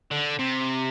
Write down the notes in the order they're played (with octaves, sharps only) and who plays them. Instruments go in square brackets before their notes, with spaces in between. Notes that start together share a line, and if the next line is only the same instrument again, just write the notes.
[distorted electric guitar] D3
C3